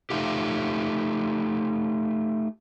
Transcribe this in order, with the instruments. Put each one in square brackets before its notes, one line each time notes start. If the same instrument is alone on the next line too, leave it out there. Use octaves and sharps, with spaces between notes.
[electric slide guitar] A3 D#4 F4 G4